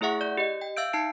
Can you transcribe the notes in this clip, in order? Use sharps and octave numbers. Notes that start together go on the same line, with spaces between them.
A3 E4 G#4 E5 F#5 C#6
D5 G6
G4 D#5
G5
E5 F5 E6 G6 D7
D#4 A5 C7 D7